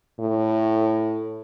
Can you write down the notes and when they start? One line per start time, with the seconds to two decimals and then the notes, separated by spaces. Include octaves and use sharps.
0.20 A2